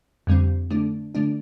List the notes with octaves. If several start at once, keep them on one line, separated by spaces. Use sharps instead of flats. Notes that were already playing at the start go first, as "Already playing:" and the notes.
F2 D3 G3 C4
D3 A3 D4
D3 A3 D4